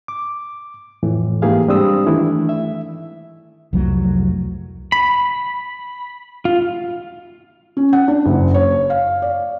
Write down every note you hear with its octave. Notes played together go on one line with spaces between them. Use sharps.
D6
F2 A2 E3
G#2 E3 A#3 G4 G#4 F5
G3 G#3 C4 D4 D#6 E6
D#3 E3 A3 D4 E4
E5
C2 F2 F#3 A3
B5
F4
C#4
F#5
D4
F#1
C#5
F5
D5